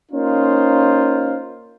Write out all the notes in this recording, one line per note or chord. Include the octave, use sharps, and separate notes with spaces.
A#3 C#4 D#4 F4 C5